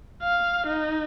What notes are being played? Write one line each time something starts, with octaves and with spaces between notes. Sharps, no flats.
F5
D#4